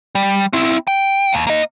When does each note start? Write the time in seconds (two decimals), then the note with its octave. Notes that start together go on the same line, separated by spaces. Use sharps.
0.15 G3
0.53 C4 E4
0.88 G5
1.33 D#2
1.47 A#3 D#5